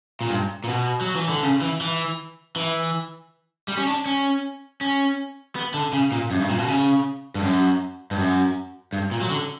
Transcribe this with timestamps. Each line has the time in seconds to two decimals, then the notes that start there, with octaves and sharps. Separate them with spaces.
0.21 A#2
0.31 G2
0.64 A#2
0.68 B2
1.01 F#3
1.15 E3
1.29 D3
1.43 C#3
1.62 E3
1.81 E3
2.56 E3
3.68 G3
3.77 C#4
3.87 D4
4.06 C#4
4.81 C#4
5.56 B3
5.74 D3
5.93 C#3
6.12 A#2
6.31 F#2
6.40 G2
6.50 A#2
6.59 B2
6.68 C#3
7.35 G2
7.43 F#2
8.11 G2
8.18 F#2
8.93 G2
9.11 A#2
9.21 F#3
9.30 D3